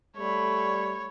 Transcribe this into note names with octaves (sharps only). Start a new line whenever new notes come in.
G3 A3 C#5 B5